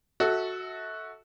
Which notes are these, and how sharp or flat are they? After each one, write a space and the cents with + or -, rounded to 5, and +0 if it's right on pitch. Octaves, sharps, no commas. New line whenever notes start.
F#4 +0 A4 +0 E5 -35